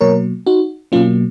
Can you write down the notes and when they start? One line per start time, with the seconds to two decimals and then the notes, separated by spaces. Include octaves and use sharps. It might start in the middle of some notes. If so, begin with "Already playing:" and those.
0.01 B2 F#3 A#3 A#4 C#5
0.47 D#4 F#4
0.92 B2 F#3 A#3 C#4 F4